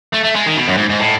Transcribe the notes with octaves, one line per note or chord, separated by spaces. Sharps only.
A3
A3
G#3
D#3
B2
F#2
G#2
G#2
A2